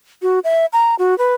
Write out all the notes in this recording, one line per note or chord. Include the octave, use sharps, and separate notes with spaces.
F#4
E5
A#5
F#4
B4